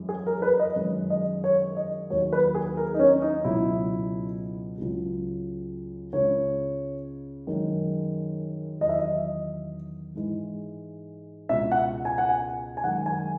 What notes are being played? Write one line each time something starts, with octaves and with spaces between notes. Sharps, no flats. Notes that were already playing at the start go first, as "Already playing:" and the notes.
Already playing: F#2 E3 G#3
G#4
A#4
B4
D#5
F#2 D#3 G#3
D#5
C#5
D#5
D#2 D#3 F#3 C#5
B4
G#4
A#4
D#4
C#4
D#4
C#2 B2 F#3 E4
C#2 C#3 F#3
C#2 C#3 G#3 C#5
F#2 D#3 G#3
E2 D#3 F#3 D#5
E5
D#5
G#2 E3 G#3
C#2 B2 G#3 E5
F#5
G#5
F#5
G#5
G#5
F#2 D#3 G#3 F#5
G#5